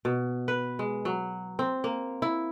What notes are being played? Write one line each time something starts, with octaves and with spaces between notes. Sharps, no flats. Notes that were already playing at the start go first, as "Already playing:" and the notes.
B2
B4
G#3
F#3
C4
A#3
E4